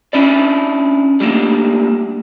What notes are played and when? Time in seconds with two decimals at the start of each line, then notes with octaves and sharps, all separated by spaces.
0.13 C#4 D4 E4 D5
1.20 G3 A3 A#3 D4